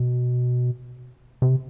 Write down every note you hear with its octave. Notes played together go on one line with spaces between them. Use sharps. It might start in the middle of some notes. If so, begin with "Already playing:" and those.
Already playing: B2
C3